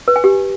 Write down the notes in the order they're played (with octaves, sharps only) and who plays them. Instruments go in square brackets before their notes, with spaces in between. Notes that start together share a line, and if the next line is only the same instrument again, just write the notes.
[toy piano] B4
G#5
G4